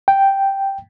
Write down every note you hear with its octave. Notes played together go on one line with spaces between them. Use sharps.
G5